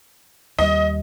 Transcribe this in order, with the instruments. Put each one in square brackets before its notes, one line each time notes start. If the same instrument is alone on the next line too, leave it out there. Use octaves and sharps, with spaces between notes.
[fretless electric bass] D#2 G3 [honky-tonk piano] D#5